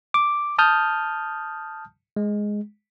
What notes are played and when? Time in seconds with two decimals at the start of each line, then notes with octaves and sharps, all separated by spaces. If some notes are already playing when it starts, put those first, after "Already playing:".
0.14 D6
0.58 A5 D#6 F6 G6
2.17 G#3